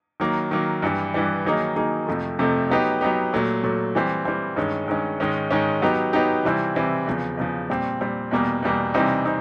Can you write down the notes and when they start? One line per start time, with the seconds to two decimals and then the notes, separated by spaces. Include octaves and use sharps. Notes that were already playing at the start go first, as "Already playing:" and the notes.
0.20 D#3 F#3 A#3
0.51 D#3 F#3 A#3
0.82 G2 E3 G3
1.14 G2 E3 G3
1.45 D#3 F#3 A#3 D#4 G#4
1.76 D#3 F#3 A#3 D#4 G#4
2.07 F2 C3 F3 A3
2.39 F2 C3 F3 A3
2.70 F#3 B3 D#4 G4
3.01 F#3 B3 D#4 G4
3.33 A#2 F#3 A3
3.63 A#2 F#3 A3
3.95 E3 G3 C4
4.25 E3 G3 C4
4.56 G2 D#3 G#3 C#4
4.88 G2 D#3 G#3 C#4
5.20 G#2 D#3 G#3 C#4
5.51 G#2 D#3 G#3 C#4
5.82 F#3 B3 D#4 G4
6.13 F#3 B3 D#4 G4
6.44 C3 E3 G3 C4 E4
6.75 C3 E3 G3 C4 E4
7.07 E2 C#3 F3
7.37 E2 C#3 F3
7.70 A#2 G3 C4
8.01 A#2 G3 C4
8.31 E2 B2 G3 A#3
8.63 E2 B2 G3 A#3
8.94 C3 E3 G3 C4 D#4
9.25 C4 D#4